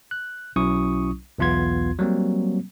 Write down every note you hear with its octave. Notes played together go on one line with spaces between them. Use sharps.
F#6
B1 F#3 C#4 E4 C#6 D#6
B1 E2 B3 F4 C6 G#6
F#3 G3 A#3 C4